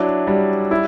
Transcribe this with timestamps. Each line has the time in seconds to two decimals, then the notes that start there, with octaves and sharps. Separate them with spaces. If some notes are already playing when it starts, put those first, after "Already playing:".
Already playing: F#3 D4 E4
0.27 G3
0.71 E4